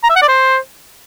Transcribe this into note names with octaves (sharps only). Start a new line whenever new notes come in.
A#5
E5
F#5
D5
C5